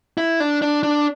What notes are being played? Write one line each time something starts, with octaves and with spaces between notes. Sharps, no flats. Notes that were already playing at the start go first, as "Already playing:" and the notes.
E4
D4
D4
D4